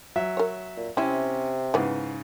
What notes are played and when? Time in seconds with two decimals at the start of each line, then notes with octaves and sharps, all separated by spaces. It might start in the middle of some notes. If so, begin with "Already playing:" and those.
0.16 F#3 E5
0.37 A#4 C#5
0.77 A#2
0.97 C3 C4 C#4 E4
1.74 G#2 C#3 E3 B3